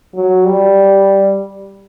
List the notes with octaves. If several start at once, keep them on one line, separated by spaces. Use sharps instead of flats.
F#3
G3